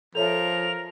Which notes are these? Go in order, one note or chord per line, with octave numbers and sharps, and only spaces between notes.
F3 A4 A#4 C#5 E5 F7